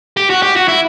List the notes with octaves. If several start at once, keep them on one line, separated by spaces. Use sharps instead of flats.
G4
F#4
G4
F#4
E4